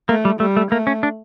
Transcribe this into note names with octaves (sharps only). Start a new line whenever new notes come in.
A3 A#3
G3
G3 A3
A3
A3 A#3
C#4
D4